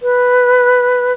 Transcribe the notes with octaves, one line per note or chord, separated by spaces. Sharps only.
B4